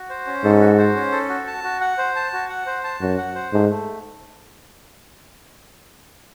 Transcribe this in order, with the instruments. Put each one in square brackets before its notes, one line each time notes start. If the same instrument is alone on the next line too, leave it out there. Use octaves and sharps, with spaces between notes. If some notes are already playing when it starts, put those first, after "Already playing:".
Already playing: [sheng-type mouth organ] F#4
C5
C#4
[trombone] G#2 [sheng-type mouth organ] A4
[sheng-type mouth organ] F#4
C5
C#4
A4
F#4
A5
F#4
F#5
C5
A5
F#4
F#5
C5
A5
[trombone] F#2 [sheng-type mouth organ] F#4
[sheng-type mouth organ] F#5
C5
[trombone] G#2 [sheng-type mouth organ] A3
[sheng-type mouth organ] A3